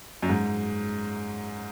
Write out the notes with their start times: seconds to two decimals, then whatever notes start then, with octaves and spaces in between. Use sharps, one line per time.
0.23 F#2
0.29 G#2